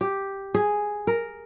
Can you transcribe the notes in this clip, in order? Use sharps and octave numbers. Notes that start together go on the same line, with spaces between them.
G4
G#4
A#4